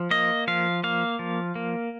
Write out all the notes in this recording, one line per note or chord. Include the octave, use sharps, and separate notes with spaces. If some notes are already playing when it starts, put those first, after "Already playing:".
Already playing: F3
A#3 D#5
F3 F5
A#3 F5
F3
A#3